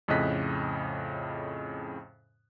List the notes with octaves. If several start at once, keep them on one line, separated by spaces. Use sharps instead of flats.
F2 A2 C#3 D#5 F#6 B6